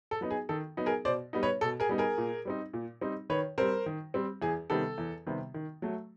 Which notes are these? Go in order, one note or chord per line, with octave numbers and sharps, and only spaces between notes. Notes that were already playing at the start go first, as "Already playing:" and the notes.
A4
F#3 B3 D#4
G#4
D#3 A4
F#3 B3 D#4
G#4 A#4
B2 C5 D5
G3 B3 D#4
B4 C#5
B2 A4
G#4 A#4
G3 B3 D#4
G#4 A#4
A#2
G3 C4 D#4
A#2
G3 C4 D#4
D#3 B4 C#5
G3 C4 A#4 C5
D#3
G3 C4
E2 G#4
C3 D#3 G3 B3 A4
E2
C3 D#3 G3 B3
D#3
F#3 A3